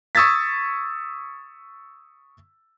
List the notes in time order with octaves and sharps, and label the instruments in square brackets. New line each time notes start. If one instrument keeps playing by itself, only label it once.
[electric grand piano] C#6 D#6 E6 G#6 A6 B6